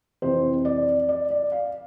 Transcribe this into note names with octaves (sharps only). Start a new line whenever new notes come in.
F2 C3 E3 C5
D5
D5
D5
F5